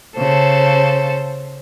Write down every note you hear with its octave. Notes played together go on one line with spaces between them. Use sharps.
C#3 A4 C5